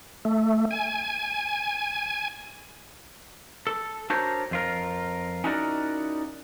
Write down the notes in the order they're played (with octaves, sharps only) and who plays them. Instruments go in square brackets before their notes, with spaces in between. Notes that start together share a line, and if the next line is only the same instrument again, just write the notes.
[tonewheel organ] A3
G#5
[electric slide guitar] A4
D4 F#4 A4 A#4 C5 C#5
F2 F4 A#4
C#4 D#4 E4 F#4 A#4 D5